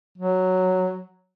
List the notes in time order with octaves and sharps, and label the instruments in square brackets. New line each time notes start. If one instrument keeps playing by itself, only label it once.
[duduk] F#3